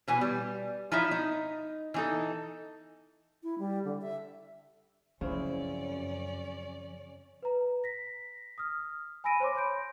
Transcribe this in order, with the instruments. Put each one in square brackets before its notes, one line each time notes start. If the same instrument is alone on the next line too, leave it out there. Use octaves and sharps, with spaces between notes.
[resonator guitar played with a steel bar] B2 E3 G#5
G3
F3 D#4 E4 E5
D#4
E3 D#4 A4
[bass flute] E4
G3
D3
E5
[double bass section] F#2 [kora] C#3 C4 E4 [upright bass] F3 [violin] C#4 D5
[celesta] B4 A#5
A#6 B6
D#6 F6
G#5 B5 E6 A#6 D7 D#7
C5 C#5 C6 D6
B5 C6 G6 D7